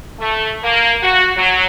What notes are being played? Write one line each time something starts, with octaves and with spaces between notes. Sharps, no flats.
A3
A#3
F#4
F#3